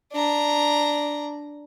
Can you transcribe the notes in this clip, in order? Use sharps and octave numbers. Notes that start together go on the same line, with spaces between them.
D4 A#5